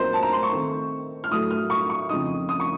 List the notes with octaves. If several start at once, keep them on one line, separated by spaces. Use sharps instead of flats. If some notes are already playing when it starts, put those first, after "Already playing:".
Already playing: A#2 F#3 C4 D#4 A#4 C5
A5
A#5
C6
C#6
D#3 A3 C4
F6
A2 F#3 A3 D#6
F6
C#6
C#6
F2 C#3 F3 C4 D#4 D#6
D#6
C#6